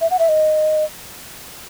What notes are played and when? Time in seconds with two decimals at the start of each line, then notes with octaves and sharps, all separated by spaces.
0.01 E5
0.11 F#5
0.19 E5
0.29 D#5